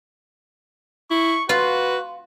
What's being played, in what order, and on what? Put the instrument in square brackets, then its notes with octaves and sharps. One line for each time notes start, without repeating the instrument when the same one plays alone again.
[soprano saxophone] E4 [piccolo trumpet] C#6
[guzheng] F4 [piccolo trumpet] F#4 [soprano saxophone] B4